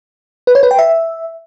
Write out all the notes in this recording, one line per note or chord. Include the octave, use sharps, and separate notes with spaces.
B4
C#5
B4
G5
E5